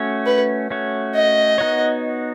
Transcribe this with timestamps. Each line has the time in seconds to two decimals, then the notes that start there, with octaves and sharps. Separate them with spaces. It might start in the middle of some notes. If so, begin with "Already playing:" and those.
Already playing: A3 C#4 F#4 C#5
0.26 B4
0.70 A3 C#4 F#4 C#5
1.15 D#5
1.58 B3 D#4 F#4 C#5